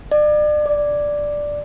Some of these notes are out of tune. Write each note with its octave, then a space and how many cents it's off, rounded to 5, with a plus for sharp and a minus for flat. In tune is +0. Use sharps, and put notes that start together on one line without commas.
D5 +35
D5 +0